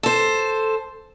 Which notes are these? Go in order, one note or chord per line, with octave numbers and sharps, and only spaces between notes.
A4 C5